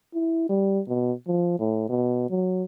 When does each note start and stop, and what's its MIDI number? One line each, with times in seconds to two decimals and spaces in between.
0.14 0.46 64
0.49 0.80 55
0.88 1.12 47
1.28 1.56 53
1.59 1.85 45
1.89 2.28 47
2.30 2.63 54